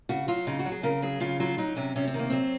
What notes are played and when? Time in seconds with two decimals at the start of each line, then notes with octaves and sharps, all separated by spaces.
0.09 C#3 F#4
0.28 F#3 F4
0.47 C#3 D#4
0.59 F#4
0.66 F#3
0.72 G#4
0.83 C#3 A#4
1.02 F#3 G#4
1.20 C#3 F4
1.40 F#3 F4
1.58 F#3 D#4
1.76 C3 C#4
1.96 C3 C#4
2.08 C4
2.14 D#3 A#3
2.30 F#3 C4